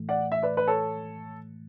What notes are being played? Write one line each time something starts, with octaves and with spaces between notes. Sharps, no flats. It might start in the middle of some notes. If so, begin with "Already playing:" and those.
Already playing: A2 E3 A3
D5 F#5
E5
B4 D5
B4
A4 C#5